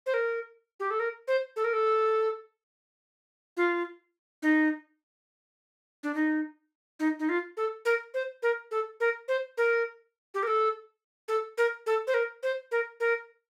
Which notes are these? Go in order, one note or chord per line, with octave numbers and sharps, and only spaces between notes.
C5
A#4
G4
A4
A#4
C5
A4
A#4
A4
F4
D#4
D4
D#4
D#4
D#4
F4
A4
A#4
C5
A#4
A4
A#4
C5
A#4
G4
A#4
A4
A4
A#4
A4
C5
A#4
C5
A#4
A#4